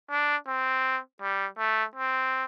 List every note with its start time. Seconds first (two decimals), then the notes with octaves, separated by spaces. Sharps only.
0.10 D4
0.47 C4
1.21 G3
1.58 A3
1.95 C4